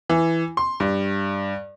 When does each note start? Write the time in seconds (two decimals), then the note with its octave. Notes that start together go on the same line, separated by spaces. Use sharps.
0.10 E3
0.57 C6
0.80 G2